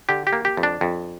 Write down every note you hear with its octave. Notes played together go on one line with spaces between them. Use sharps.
D3 G4
G4
A#3
G4
F2
D4
F2